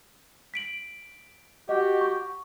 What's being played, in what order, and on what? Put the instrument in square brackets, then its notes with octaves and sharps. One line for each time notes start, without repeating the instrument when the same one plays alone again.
[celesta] B6 D7 F#7
[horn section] F#4 G4 [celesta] D#5
[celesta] C#6